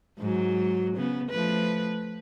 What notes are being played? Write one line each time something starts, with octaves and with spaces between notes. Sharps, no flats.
G#2 F#3
C#3 B3
F3 A3 B4